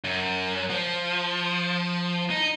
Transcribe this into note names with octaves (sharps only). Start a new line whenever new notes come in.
F#2
F3
D#4